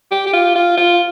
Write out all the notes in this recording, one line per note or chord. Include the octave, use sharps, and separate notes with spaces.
G4
G4
F4
F4
F4